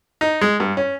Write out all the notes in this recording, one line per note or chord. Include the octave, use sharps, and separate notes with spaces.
D#4
G#3
G2
C#4